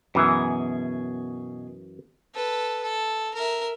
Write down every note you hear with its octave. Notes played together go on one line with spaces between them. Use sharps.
F#2 B2 E3 G#4
A4 B4
A4
A#4 E5